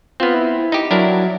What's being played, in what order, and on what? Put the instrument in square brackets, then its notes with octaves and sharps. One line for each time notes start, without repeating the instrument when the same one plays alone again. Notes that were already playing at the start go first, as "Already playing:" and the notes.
[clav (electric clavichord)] B3 C4 [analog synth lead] F4
[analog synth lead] E4
[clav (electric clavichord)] D#4 G4
[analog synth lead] F#3 [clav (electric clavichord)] D4 E4 A#4